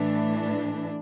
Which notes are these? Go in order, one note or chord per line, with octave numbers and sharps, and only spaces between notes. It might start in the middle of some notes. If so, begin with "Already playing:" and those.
Already playing: A2 E3 A3 D4